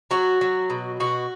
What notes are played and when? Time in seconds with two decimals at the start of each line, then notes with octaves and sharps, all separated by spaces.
0.11 F#3 F#4
0.41 F#3
0.70 B2
1.00 B2 F#4